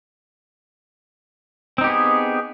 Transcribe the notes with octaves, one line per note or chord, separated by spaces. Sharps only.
B3 C4 D#4 G4 G#4